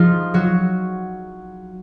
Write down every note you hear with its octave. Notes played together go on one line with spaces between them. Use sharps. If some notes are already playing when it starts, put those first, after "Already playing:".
Already playing: F3 D#4 F4 G#4
F#3 F#4